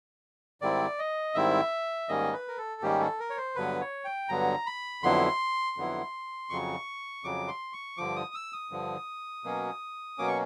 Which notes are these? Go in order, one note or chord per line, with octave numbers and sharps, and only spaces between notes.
G#2 D#3 G3 C4 E4 D5
D#5
G#2 D#3 G3 C4 E4 E5
G#2 D#3 G3 A#3 C#4 D#5
B4
A#4
A4
G#2 D#3 G3 A#3 C#4 G4
A4
A#4
C#5
C5
G2 D3 F#3 B3 B4
C#5
G5
G2 D3 F#3 B3 A#5
B5
F2 D3 F#3 B3 E4 C6
F2 D3 F#3 B3 E4
F2 C#3 F#3 C#6
F2 C#3 F#3 D6
C6
C#6
G2 D3 F3 D6
D#6
E6
D#6
G2 D3 F3
B2 F#3 A#3 C#4
B2 F#3 A#3 C#4 D6
C#6